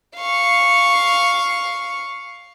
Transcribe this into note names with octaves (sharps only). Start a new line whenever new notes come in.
F5 C#6